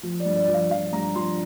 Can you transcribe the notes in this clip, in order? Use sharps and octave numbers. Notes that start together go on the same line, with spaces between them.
F3
D5
G2
D5
F3
F5
F3 F5
G2 A#5
F3 C6